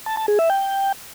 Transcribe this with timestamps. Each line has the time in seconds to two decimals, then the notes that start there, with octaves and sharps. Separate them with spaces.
0.06 A5
0.17 A5
0.28 G#4
0.39 E5
0.50 G5